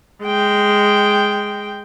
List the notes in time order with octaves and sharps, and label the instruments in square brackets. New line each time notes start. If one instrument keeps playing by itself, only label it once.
[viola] G#3 G5